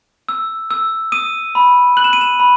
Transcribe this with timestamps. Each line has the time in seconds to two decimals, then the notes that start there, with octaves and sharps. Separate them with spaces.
0.29 E6
0.71 E6
1.12 D#6 D#7
1.55 B5
1.97 F#6 F#7
2.04 E7
2.13 D#7
2.21 E7
2.40 B5